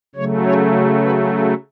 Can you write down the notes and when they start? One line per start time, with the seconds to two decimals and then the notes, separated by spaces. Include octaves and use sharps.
0.15 C#3 F#3 A3 C#5
0.45 C#5
1.02 B4
1.30 A4